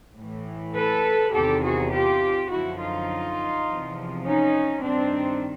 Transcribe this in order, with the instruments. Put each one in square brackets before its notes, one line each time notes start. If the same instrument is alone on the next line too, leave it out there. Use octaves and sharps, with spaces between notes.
[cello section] A2
E3
A4 B4
E2 C3 D#3 G4 A4
F#4 G#4
F4 G4
F#2 D3 F3 E4 F#4
D#4 F4
E2 C3 F3
C#4 D#4
G2 D#3 C4 D4